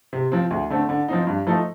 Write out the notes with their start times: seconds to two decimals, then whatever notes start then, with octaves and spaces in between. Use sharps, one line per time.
0.13 C3
0.32 F3 C4
0.51 D2
0.70 D3 A3 C4
0.89 D3
1.08 F3 C4 D#4
1.27 G2
1.47 F3 A3 D#4